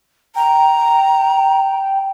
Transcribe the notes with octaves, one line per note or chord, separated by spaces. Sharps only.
G5 A#5